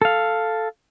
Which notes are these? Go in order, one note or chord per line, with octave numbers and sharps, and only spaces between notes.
A4 F5